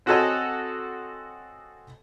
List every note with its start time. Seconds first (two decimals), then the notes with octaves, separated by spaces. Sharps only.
0.06 C4 F#4 G#4 A4 C#5 D#5